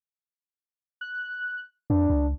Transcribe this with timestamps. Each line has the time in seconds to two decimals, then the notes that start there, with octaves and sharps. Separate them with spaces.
1.01 F#6
1.90 F2 D4
2.10 C#2